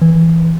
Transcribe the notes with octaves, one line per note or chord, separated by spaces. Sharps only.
E3